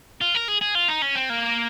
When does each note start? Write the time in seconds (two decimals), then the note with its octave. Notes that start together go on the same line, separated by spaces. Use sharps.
0.21 F4
0.35 A#4
0.48 G#4
0.61 G#4
0.75 F4
0.88 D#4
1.02 C#4
1.15 C4
1.30 A#3